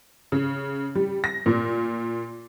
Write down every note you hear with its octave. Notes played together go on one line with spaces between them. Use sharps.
C#3
G3
A#6
A#2